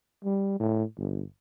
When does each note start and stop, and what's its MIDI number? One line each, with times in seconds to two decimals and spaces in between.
0.24 0.56 55
0.60 0.84 45
0.97 1.23 31